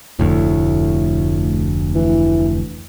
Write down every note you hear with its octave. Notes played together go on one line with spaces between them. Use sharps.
F1 D2 A2
E3